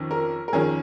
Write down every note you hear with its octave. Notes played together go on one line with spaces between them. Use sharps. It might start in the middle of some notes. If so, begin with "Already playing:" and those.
Already playing: F2 D#3 C#4
A#4
A#4
F2 D#3 C#4 G#4